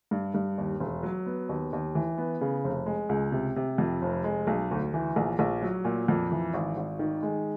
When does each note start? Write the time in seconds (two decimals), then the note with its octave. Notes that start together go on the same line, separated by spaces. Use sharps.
0.11 G2
0.34 G2
0.58 D#2
0.80 E1
1.03 F#3
1.26 B3
1.49 D#2
1.73 D#2
1.95 E3
2.18 B3
2.41 C#3
2.64 F1
2.86 G#3
3.09 C#2
3.32 C3
3.56 C3
3.78 F2
4.02 F1
4.24 G#3
4.47 B1
4.71 D2
4.94 E3
5.16 A#1
5.39 A#1
5.62 F#3
5.85 A#2
6.08 F2
6.32 E3
6.54 G#1
6.77 G#1
6.99 D#3
7.23 G#3